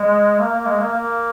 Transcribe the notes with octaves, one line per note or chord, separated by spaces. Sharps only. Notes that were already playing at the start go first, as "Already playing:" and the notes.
Already playing: G#3
A#3
A#3
G#3
A#3
A#3